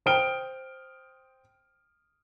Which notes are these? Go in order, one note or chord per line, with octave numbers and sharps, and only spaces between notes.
C5 G5 D#6 F6 D7 G7